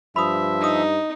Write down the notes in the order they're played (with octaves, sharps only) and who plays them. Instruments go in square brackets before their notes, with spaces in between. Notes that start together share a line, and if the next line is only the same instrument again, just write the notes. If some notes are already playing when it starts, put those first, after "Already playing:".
[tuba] G2 [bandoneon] F3 E5 [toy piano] B5 D#6
[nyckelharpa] D#4 [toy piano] A#5 D#6